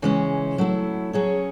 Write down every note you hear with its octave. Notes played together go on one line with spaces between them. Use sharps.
C#3 E3 G#3 C#4
F#3 A3 E4
F#3 C#4 G#4 C#5